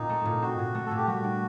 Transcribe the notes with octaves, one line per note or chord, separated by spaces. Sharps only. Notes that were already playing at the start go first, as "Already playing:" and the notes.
Already playing: A#2 C4 D#4
A3
A#2
C4 F#4
A#2
A3
A#2 A4
G4
G3 F#4
D4